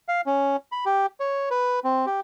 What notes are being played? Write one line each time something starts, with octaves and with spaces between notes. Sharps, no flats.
F5
C#4
B5
G4
C#5
B4
C4
G4